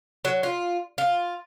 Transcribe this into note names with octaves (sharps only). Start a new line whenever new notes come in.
F#3
F4
F4